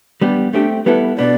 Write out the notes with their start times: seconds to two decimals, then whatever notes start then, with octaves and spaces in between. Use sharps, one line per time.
0.21 G3 B3 D4 G4
0.53 A3 C4 D4 G4
0.86 G3 B3 E4 A4 B4
1.18 B2 B3 D4 D5